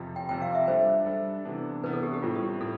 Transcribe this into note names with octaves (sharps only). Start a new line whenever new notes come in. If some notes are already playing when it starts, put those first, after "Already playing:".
Already playing: F2 C3 F3
G5
F2 C3 F3 G5
F5
E5
G3 D4 A4 C5
G3 D4 A4
C3 E3 B3 D4
C3 E3 B3 D4 B4
A4
G4
G4
A2 G3 C4 F4
G4
A2 A4